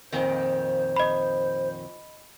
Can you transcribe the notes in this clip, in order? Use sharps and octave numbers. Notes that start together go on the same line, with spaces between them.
F2 A#2 D#3 C5
D#5 B5